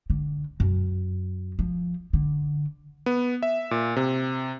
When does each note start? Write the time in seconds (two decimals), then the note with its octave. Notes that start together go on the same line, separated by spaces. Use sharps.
0.10 D3
0.60 F#2
1.59 F3
2.13 D3
3.06 B3
3.43 E5
3.71 A#2
3.96 C3